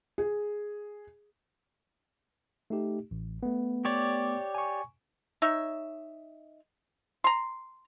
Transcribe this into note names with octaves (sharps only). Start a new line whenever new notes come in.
G#4
A3 D#4 G4
A1
A3 B3
G4 C#5 D5
G#5 C#6
D#4 C#5 E5
A#5 C6